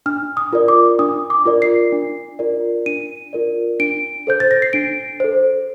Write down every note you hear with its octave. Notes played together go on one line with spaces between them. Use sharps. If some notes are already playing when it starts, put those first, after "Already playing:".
D4 F6
D#6
F4 A#4 D5
D6
D4 D#6
D6
F4 A#4 D5
C7
D4
F4 A#4 D5
D4 D#7
F4 A#4 D5
D4 D7
A4 C5 G6
A6
A#6
C7
D4 D7
A4 C5